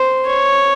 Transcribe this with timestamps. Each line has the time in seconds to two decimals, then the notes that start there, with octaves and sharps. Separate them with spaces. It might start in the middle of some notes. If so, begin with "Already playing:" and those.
Already playing: C5
0.27 C#5